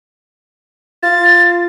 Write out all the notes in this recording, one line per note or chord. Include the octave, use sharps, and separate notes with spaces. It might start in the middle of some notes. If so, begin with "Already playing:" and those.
F4 A6